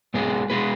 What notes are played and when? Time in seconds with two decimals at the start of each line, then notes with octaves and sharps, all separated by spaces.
0.14 G#2 G#3 B3 G#4
0.50 G#3 B3 G#4 B4